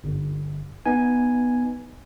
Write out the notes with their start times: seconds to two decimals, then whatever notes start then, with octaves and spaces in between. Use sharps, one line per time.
0.04 G1
0.86 B3 D#4 G#5